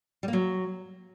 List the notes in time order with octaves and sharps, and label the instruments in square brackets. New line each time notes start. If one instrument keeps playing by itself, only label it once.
[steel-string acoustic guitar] G3
A#3
F#3